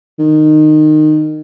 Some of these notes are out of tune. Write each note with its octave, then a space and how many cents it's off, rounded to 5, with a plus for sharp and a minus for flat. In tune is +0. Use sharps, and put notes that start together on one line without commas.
D#3 -20